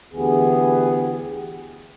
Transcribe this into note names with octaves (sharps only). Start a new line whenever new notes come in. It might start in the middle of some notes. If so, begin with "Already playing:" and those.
D2 E3 B3 G4 G#4